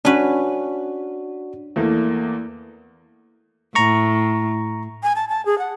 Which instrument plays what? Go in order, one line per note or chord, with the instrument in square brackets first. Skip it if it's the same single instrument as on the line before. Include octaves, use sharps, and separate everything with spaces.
[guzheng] C#4 B4 [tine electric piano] D4 F#4
[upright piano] E2 A3 A#3
[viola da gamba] A2 [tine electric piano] A#5 C#6
[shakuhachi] G#5
A5
A5
G#4
F#5